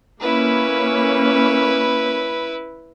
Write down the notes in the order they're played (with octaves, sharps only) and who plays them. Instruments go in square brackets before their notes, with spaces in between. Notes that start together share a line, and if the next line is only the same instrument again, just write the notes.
[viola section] A#3 C#4 [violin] E4 B4